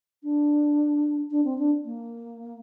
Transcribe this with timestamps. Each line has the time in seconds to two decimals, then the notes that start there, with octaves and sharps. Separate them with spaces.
0.23 D4
1.31 D4
1.44 C4
1.58 D4
1.85 A#3